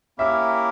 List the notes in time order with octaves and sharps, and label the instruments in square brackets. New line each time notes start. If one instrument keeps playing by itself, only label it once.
[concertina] A#3 C#4 E4 G4 A#4 [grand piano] E5